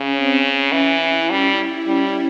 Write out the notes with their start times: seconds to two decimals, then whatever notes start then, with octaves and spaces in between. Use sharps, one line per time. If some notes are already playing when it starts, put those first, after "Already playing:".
Already playing: C#3 C#4
0.16 C4
0.44 C#4
0.72 E3 C#4
1.01 E4
1.30 G3 C#4
1.58 E4
1.86 G3 C#4